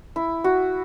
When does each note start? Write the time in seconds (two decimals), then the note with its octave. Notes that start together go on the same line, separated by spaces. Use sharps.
0.16 E4
0.44 F#4